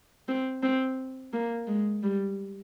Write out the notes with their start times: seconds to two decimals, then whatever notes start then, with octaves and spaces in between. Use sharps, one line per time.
0.28 C4
0.63 C4
1.33 A#3
1.67 G#3
2.03 G3